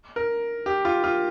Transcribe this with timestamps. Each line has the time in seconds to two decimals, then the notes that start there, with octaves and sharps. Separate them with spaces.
0.16 A#4
0.66 G4
0.85 F4
1.04 F4